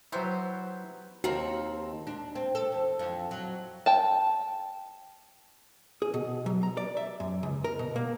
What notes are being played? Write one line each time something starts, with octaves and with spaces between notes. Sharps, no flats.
F#3 B3 E4 G4 C5
D#2 C4 F#4 A4 A#4
D4
C4
A4
E2
F2
F#3
G5 A5
G#4
B2
F#3
A#5
D5
E5
F#2
C#2
A#4
B2
A#3